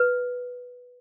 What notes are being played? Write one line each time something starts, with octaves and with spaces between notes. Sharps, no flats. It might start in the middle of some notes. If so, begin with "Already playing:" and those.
Already playing: B4